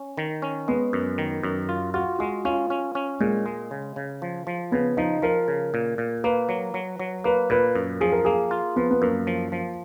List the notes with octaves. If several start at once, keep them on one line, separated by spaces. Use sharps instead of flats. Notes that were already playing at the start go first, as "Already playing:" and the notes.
Already playing: C#4
D#3
C#4
G#3 B3
F#2
D#3
F#2
F4
F4 F#4
G#3 F#4
C#4 F4
C#4
C#4
A#2 G#3
G#3
C#3
C#3
F3
F3
C#3 B3
F3 D#4
F3 A#4
C#3
A#2
A#2
A#3 B4
F#3
F#3
F#3
A#3 B4
A#2 B4
F#2
F3 G#4
A#4
A#3 G#4
F4
F3 B3
B3
F#2 A#3
F3
F3